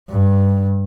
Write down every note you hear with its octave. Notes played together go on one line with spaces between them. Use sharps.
G2